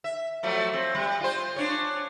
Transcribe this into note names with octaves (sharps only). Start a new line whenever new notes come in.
E5
F3 F#3 A3
C4
G3
F4 C5
C#4 D4 C#5